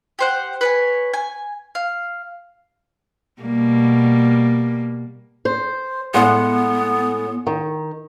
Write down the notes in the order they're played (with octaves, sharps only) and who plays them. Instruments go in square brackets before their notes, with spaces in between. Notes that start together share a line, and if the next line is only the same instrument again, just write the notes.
[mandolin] G4 C5 F#5
B4 C#5 G#5
G#5
F5
[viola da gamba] B2 G3 A#3
[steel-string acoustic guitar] C5
[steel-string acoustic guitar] A2 G#3 F#5 [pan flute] B3
[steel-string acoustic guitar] D#3